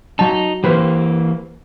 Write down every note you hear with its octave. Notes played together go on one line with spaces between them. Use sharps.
F#3 D#4 A5
E3 A#3 G4 B4 C5